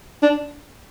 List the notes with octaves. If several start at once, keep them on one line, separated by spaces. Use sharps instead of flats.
D4